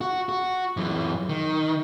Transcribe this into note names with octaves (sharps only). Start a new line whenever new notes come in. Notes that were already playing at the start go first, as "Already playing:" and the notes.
F#4
F#4
F#2 E3
D#3